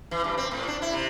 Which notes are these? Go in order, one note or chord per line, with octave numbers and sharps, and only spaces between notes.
E3
G2
C4
A2
D4
E4
C3